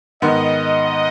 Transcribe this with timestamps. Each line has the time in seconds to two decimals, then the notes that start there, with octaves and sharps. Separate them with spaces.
0.22 G#2 D#3 B3 D#5